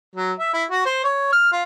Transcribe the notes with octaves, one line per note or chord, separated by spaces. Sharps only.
F#3
E5
E4
F#4
C5
C#5
F6
F4